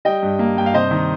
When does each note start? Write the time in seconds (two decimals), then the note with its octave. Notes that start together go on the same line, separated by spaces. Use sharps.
0.05 G3 D#5 G5
0.23 G2
0.39 A#3
0.56 G2 G5
0.66 F5
0.74 C3 C5 D#5
0.91 D#3